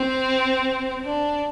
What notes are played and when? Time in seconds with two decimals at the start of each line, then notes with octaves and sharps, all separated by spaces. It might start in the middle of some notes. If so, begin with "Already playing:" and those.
Already playing: C4
1.05 D4